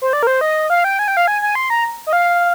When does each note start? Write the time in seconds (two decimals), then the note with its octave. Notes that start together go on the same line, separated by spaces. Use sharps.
0.02 C5
0.13 D5
0.23 A#4
0.27 C5
0.41 D#5
0.70 F5
0.84 G5
0.99 G#5
1.08 G5
1.17 F5
1.27 G#5
1.42 G#5
1.55 C6
1.70 A#5
2.07 D#5
2.13 F5